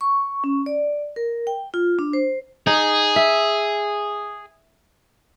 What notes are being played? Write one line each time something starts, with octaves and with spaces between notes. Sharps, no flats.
C#6
C#4
D5
A#4
G5
F4
D4
C5
D#4 G#4
E5